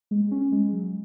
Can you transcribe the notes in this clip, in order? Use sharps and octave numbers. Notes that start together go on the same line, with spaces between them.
G#3
C#4
G#3
F#3